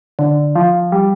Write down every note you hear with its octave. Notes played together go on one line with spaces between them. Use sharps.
D3
F3
G3